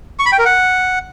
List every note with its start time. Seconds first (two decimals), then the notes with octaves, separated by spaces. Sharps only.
0.19 C#6
0.26 B5
0.32 G5
0.39 A#4
0.45 F#5